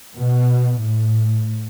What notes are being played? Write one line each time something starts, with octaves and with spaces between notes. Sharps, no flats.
B2
A2